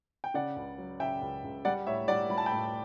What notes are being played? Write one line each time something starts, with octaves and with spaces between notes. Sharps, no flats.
G5
C#3 D5 F#5
C#2
F#3
C#3 E5 G5
C#2
C#2
G3 D5 F#5
A2 C#5 E5
G3 D5 F#5
G3 B5
A5
G5 B5
A2